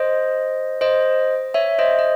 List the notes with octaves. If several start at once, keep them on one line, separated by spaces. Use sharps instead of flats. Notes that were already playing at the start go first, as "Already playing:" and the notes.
Already playing: C5 D#5
C5 D#5
C#5 E5
C5 D#5
D#5